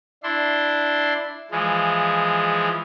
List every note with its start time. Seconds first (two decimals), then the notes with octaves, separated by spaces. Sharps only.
0.23 D4 E4 C6
1.51 E3 F3 G#3